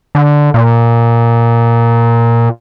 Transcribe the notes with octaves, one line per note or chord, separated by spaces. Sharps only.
D3
A#2